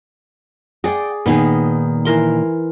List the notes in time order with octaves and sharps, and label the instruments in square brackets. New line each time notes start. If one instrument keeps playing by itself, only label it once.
[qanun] G#4 D5 [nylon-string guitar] F#5 G5
[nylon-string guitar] A#2 D#3 [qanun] B3 D#4 G#4
[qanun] E3 A#4 C6